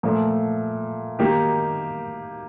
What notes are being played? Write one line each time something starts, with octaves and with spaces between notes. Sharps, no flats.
A#2 F3 A3
D#3 A#3 D#4 G4